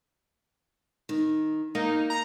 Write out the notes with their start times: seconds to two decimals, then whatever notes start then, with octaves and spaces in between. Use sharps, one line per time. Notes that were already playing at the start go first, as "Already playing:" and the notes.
1.09 D#3
1.75 A#3 D#4
2.10 A#5